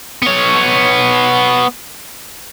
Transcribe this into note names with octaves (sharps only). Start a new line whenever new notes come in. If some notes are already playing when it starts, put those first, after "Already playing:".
B3 C#5